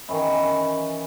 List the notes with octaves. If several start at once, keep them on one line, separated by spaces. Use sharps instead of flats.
D#3 E3 C#4 E4